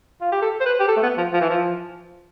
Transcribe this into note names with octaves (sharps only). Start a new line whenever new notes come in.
F4
G4
A4
C5
B4
G4
A4
A3
B3
F3
F3
E3
F3